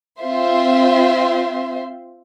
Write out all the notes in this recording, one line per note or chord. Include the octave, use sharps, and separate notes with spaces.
C4 F4 C5 E5 C6